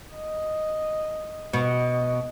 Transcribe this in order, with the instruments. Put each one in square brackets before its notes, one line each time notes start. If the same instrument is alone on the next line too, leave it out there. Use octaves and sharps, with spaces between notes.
[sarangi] D#5
[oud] B2 [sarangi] D#5